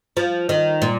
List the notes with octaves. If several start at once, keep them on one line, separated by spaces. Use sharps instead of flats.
F3
D#3
A#2